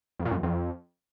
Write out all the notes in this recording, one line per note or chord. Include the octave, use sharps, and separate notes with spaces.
F2
A#2
F#2
E2
F2